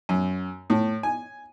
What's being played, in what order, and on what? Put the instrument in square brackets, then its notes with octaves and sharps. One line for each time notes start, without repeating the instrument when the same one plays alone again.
[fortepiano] F#2
A2
G#5